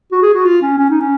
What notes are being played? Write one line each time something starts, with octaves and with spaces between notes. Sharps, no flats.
F#4
G#4
F#4
F4
C#4
C#4
D#4
C#4